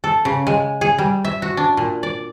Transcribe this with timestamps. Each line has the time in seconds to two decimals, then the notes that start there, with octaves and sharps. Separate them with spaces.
0.04 A4
0.25 C#3
0.47 G#3
0.81 G#4
0.98 G3
1.25 E5
1.42 F#4
1.57 D4
1.77 A#2
2.03 D5